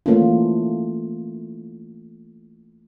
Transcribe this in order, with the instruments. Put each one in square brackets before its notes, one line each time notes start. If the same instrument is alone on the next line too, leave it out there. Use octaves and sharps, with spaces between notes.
[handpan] E3 A3 A#3 C#4 E4 F4